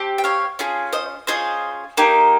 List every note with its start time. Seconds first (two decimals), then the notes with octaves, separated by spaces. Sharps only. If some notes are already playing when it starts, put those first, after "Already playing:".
Already playing: C4 G4
0.18 G5
0.24 C#5 F5
0.59 C#4 F4 G#4
0.93 C5 D#5
1.27 C#4 F4 G#4 C5 D#5
1.97 A#3 D#4 G4